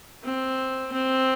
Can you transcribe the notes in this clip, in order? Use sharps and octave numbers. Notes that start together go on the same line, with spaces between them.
C4
C4